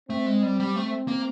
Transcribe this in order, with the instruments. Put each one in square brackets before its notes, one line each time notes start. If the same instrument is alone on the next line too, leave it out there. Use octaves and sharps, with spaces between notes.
[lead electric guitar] A3 [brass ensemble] C4
[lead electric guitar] G#3
G3
G3
[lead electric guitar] A3 [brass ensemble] C4
[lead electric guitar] A#3